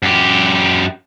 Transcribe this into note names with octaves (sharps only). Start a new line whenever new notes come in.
F#2 G4